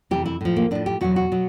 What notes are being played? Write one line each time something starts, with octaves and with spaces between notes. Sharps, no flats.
F2 C3 E3 G4
E4
A2 F3
A#3
A2 F3 D4
G4
E2 B2 F#3 F#4
F#4
B2 F#3